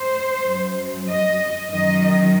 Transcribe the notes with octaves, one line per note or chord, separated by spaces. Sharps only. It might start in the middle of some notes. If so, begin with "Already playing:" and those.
Already playing: C5
F#2 F#3
D#5
F#2 D#3 F#3 D#5